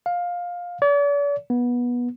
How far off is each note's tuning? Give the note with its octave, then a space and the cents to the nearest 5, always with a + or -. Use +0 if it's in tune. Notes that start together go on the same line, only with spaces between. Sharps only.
F5 +15
D5 -45
B3 -20